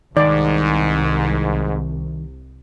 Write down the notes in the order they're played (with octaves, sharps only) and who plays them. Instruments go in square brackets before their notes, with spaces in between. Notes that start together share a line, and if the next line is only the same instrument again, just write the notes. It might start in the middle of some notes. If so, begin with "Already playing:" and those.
[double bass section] C2 [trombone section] G#2 [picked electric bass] D#3 [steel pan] D5